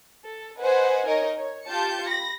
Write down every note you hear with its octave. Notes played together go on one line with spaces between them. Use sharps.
A4
B4 C5 D#5 F#5 G#5
D#4 A#4 C#5 D#5
C#5
F4 G4 A5 G6 C#7
B5 A#6